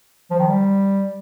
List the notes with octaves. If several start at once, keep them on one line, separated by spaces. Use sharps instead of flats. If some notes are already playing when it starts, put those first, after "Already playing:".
F3
D#3
G3